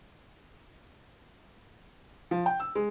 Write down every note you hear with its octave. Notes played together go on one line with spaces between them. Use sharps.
F3
G5
E6
G#3